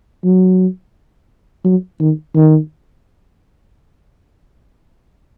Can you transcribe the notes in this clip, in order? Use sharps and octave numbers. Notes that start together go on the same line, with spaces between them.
F#3
F#3
D#3
D#3